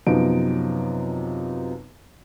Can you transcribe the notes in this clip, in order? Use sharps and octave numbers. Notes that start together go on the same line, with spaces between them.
F#2 C3 F3 B3 D#4 D7